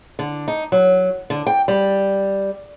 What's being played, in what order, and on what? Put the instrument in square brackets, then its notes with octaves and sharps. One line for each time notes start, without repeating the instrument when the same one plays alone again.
[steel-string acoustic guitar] D3
D#4
F#3
D3
G5
G3